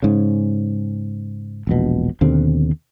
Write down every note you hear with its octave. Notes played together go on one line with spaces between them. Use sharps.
G#2 C#3
E1 A#1 B2
D#2 B2 D3 C4